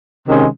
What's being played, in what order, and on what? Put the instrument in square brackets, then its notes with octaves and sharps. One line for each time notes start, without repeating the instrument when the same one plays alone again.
[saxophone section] C3 D#3 G#3 C#4